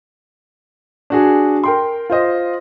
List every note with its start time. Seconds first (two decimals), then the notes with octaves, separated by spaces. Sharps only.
1.10 D4 F#4 G#4
1.64 A#4 G5 C6
2.10 F4 C5 D#5